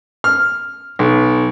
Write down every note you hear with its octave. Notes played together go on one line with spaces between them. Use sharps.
F6
B1